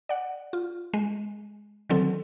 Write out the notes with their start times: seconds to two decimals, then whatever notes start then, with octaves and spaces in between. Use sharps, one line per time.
0.09 D5 F#5
0.53 F4
0.94 G#3
1.89 D3 D#3 F#3 C4 A4